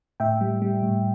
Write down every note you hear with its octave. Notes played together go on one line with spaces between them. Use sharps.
A2 E5 G5
G3
G3
A2